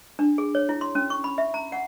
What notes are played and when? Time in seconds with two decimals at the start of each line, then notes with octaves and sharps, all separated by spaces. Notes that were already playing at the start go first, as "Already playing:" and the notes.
0.19 D4
0.38 G#4
0.55 C#5
0.69 E4
0.81 C6
0.95 C#4
1.10 C#6
1.24 B5
1.38 E5
1.54 A#5
1.72 F#5